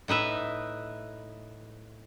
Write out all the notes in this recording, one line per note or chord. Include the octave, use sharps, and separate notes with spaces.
A2 D#4 B4 E5